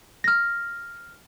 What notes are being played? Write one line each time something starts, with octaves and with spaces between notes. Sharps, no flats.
F6 A#6